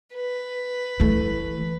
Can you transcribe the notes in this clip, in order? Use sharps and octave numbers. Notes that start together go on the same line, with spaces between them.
B4
E3 A3